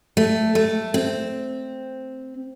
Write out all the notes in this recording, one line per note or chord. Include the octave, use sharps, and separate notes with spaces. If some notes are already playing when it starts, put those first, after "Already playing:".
A3
A3
C4